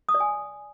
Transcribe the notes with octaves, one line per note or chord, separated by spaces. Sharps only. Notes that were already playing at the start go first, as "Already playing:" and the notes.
D#6
D5
G#5